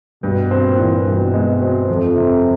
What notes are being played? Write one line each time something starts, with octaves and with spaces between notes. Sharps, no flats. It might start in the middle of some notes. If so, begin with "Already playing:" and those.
G2 B2
C4
A#2
E3
G2 B2
G#3
C4
F2 F3
C3